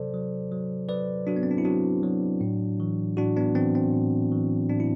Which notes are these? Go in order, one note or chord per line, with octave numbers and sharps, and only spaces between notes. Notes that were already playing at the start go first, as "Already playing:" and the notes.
Already playing: C3 F#3 A4 C5 D5
F#3
F#3
F#3 B4 D5
F#3 D4 F#4
B3
C4
D4
E4
F#3 D4 F#4
F#3
A2
E3
A2 D4 F#4
B3 D4
E3 C4
C4
A2
E3
A2 D4
E4